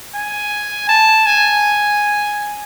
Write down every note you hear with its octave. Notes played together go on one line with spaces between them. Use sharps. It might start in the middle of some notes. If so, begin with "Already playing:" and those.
G#5
A5
G#5